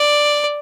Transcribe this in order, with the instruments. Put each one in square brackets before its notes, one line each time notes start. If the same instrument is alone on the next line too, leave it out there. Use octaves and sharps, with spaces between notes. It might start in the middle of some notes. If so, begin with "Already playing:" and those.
Already playing: [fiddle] D5